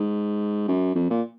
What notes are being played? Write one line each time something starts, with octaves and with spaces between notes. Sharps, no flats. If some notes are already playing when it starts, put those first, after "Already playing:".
Already playing: G#2
F#2
F2
A#2